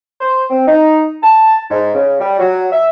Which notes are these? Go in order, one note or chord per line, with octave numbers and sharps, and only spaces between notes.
C5
C4
D#4
A5
G#2
C#3
G3
F#3
E5